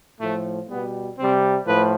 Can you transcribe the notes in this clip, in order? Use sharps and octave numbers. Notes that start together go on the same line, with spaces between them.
A2 F3 A3
B2 G3 B3
C3 G3 C4
A2 F3 B4